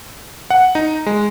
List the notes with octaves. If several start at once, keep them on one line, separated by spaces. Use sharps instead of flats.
F#5
D#4
G#3